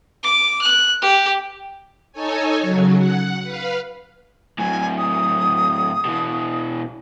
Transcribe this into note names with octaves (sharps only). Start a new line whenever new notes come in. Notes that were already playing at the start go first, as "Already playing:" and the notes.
D6
F#6
G4
D#4 A4 C#5 G#5
C#3 F#3
F#5
B4 F5
A2 F#3 G#5
D#6
B2 E3